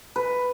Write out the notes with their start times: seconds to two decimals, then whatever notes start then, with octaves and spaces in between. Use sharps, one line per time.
0.16 B4